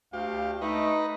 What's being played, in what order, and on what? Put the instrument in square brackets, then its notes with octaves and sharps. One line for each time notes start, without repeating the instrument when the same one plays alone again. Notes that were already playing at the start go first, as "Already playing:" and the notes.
[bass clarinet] D2 [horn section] D4 F5 [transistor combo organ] G4
[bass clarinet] A3 [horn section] D#4 [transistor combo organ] B4 D#5